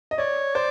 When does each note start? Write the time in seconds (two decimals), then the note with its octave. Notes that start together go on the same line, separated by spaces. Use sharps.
0.11 D#5
0.18 C#5 D5
0.54 C5 D5